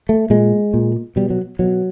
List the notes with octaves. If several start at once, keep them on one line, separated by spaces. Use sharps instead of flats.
A3
A#2 G#3
A#2
B2 G3
F#3
B2 F#3